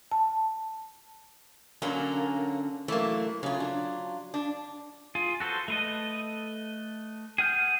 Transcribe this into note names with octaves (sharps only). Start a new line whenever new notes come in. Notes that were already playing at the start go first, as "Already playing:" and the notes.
A5
D3 F#3 A#3 C#4 D4 A#5
E3 F#3 A3 A#3
C#3 F#3 F4
D4
D4
F4 G#4
F#4 A4 B4 C5
A3 B4 D#5
G#4 F#5 F6 G6